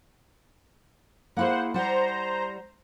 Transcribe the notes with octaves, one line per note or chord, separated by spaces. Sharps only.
A#3 E4 G#4 C5 F#5
G3 C5 F#5 A#5